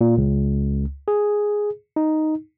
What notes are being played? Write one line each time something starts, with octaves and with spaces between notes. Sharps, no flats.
A#2
C#2
G#4
D#4